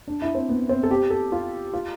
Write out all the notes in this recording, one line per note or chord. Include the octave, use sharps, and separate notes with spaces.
D4
E4
C4
B3
C4
A4
G4
A4
F4
F4